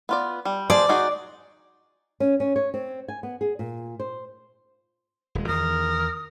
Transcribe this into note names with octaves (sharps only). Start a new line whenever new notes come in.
B3 F4 D5
G3
F3 G#4 C5 D5
D#4 F#4 G#4
C#4
C#4
C#5
C4
G#5
B3
G#4
A#2
C5
D#1 G#3
E2 D#3 A#4 D#6